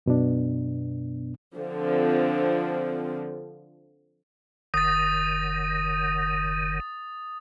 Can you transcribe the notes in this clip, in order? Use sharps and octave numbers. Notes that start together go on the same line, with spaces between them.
F#2 B2 B3 D4
D3 F3 C4
F#1 D#3 D#6 A6